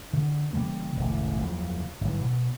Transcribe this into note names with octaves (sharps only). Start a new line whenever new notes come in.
D3
C#3 E3 G3 A#3
E1 A1 D3
F#1 E2 G2 F3
G1 G#2 E3 F#3
B2